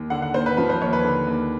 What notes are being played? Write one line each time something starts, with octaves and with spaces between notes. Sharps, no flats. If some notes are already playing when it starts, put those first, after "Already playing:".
Already playing: D#2
D3 F#5
F#5
D#2 C5
B4
F3 B4
C5
D#2 C#5
B4
D3
D#2